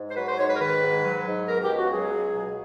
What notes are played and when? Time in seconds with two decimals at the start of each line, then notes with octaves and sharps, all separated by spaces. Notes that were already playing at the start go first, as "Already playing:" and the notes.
Already playing: G#2
0.09 C5
0.15 F#3 B4
0.26 C5
0.38 G#2 C#5
0.48 B4
0.55 A#4
0.59 D#3 B4
0.82 G#2
1.03 F#3
1.26 G#2
1.47 B2 A#4
1.62 G4
1.69 C#2
1.77 F#4
1.91 F#3 G#4
2.14 C#2
2.36 B2